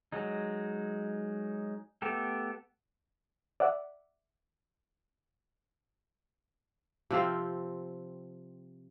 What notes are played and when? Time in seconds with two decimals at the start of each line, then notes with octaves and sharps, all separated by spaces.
0.12 F#3 G#3 D#4
2.02 A3 B3 G4 A4
3.60 D5 E5 F#5
7.11 C3 F3 C4 F5